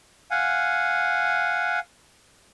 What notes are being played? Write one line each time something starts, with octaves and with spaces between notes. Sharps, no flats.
F5 F#5 G#5